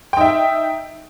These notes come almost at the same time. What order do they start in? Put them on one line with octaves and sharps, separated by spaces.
G5 D#4 E5